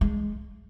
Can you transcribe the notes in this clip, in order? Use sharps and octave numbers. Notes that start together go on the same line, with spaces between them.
G#3